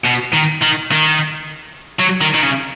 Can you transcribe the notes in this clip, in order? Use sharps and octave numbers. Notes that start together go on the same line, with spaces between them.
B2
D#3
D#3
D#3
F#3
D#3
D#3
C#3